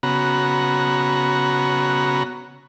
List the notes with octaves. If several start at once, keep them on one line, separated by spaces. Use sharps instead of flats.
C#3 B3 F#4 A#5